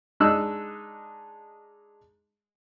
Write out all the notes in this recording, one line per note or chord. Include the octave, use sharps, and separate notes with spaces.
G#3 D4 D#4 E6 F#6